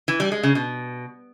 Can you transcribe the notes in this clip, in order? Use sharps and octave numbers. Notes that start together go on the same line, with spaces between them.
E3
G3
G#3
C#3
B2